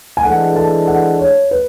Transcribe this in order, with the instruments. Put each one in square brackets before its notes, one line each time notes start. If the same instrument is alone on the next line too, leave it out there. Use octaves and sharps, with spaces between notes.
[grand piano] G#5
[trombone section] E3 G#3 D4 A4 [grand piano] F#5
[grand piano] A5
F#5
C#5
B4